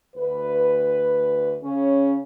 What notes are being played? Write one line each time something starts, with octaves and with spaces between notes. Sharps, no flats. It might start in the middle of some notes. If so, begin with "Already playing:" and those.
D2 B4
C#3 C#4